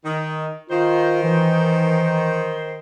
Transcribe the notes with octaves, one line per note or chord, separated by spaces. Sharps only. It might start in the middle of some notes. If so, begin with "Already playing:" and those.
D#3
D#3 F4 C5
E3